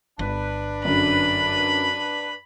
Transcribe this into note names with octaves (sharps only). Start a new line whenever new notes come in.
G1 D4 B4
F#2 D3 B5